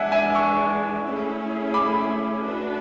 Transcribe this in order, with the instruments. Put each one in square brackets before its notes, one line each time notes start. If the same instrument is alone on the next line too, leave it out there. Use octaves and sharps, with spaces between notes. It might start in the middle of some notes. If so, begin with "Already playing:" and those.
Already playing: [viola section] E3 G#3 D4 [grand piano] E5 F#5 G#5
[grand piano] E5 G#5
C#6 E6
[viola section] A3 C#4 E4 G#4
[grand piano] B5 D6
[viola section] A3 D4 F#4 B4